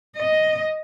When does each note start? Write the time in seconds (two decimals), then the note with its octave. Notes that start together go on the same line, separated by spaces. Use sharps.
0.17 D#5